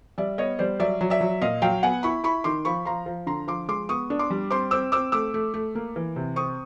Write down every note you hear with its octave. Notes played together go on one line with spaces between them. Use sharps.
G3 D5 E5
B3 C#5 D#5
G3 C5 D5
F#3 D5 E5
F#3
D5 E5
F#3
A#2 D#5 F5
F#3 F5 G5
B3 F#5 G#5
E4 B5 C#6
E4 B5 C#6
D#3 C6 D6
F3 B5 C#6
F3 A#5 C6
F3
D3 A#5 C6
F3 C6 D6
G#3 C6 D6
B3 C#6 D#6
D4
C6 D6
G3
C4 C6 D6
C4 D6 E6
C4 D6 E6
A3 D6 E6
A3
A3
A#3
E3
C3
C4 C#6 D#6